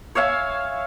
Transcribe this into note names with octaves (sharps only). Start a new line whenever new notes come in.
C#5 E5 F5 G#5